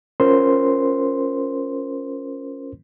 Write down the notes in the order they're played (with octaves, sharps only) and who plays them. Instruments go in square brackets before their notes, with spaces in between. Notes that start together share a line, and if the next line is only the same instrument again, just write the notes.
[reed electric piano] C#4 F4 A#4 C5 C6